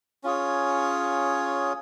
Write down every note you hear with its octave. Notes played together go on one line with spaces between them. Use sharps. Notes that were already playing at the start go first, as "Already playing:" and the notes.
C#4 F4 G#4 C#5